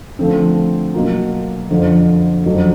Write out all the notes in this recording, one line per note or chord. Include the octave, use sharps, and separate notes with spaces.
D3 F3 A3 C4
B2 F#3 A#3
F2 D3 F3
F2 D3 F#3